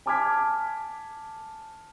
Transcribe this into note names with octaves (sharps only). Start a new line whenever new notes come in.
G#5 A5 D6 F6 G#6 B6